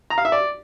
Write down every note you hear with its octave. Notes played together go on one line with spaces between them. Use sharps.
A#5
F5
E5
D5